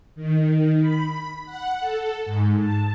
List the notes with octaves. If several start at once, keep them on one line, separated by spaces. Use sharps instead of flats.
D#3
B5
F#5
A4
G#2
A5